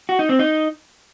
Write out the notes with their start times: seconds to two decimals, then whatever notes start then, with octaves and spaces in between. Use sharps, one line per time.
0.09 F#4
0.19 D#4
0.29 C4
0.39 D#4